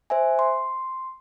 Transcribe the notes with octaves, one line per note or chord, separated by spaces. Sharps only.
C5 E5 G#5
C6